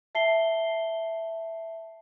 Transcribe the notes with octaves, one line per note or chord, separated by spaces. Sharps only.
E5 A5 C7 G7